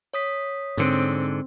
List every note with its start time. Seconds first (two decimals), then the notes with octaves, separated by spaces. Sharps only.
0.14 C#5 D#6 B6
0.77 G#2 D3 C4